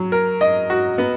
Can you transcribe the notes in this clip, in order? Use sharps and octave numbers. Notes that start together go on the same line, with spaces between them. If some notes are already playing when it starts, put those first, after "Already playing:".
Already playing: F#3
A#4
D#5
F#4
B3